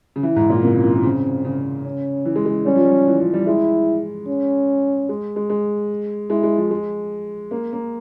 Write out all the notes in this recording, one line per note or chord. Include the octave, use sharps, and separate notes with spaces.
C#3
E3 E4
G#2
A#2
C3 A#3
C#3
E3
E3
C#3 C4
C#3
C#4
E3
G#3
G#3
G3 C#4
F3
G3
E3
F3
G3
G#3 E4
C#4
G#3
G#3
G#3
G#3 E4
G#3
F3
G#3
A#3
A#3